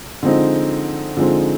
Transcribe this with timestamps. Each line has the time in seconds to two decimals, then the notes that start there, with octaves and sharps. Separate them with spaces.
0.23 D3 F3 G#3 C4 D#4
1.17 D3 F3 G#3 C4 D#4